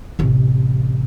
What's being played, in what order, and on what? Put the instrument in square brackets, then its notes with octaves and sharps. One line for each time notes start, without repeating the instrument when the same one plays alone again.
[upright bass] A1 C3